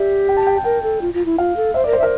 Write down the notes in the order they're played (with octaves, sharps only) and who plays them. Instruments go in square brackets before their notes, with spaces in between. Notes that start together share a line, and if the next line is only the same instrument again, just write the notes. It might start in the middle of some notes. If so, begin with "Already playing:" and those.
Already playing: [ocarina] G4 [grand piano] D5 E5
[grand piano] G5
A5
G5
A5
[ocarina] A#4 [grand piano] G5
[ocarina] A4
F4
F4
E4
[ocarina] F4 [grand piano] F5
[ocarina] A4
[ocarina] C5 [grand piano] E5
[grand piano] D5
[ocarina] A#4
[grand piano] C5
[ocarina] E5
[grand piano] A#4